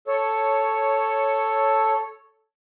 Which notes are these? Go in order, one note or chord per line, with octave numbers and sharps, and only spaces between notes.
A4 C#5